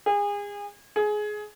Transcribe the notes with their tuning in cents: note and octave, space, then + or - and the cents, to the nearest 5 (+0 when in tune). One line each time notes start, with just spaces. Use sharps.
G#4 -30
G#4 +20